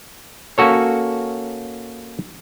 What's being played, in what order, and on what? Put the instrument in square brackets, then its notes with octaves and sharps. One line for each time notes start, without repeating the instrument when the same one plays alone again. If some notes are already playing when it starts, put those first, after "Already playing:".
[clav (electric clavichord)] A#3 C#4 F#4 A4 C#5